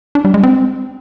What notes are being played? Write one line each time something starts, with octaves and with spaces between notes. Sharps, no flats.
D4
G3
G#3
C4